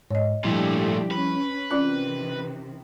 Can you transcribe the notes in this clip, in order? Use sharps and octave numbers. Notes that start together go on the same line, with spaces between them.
G#2 C#5 D#5
A#2 F3 G3 A3 D4 E4 G4
C#4 B4
C3 D#3 E3 C#4 F4 D5 F#6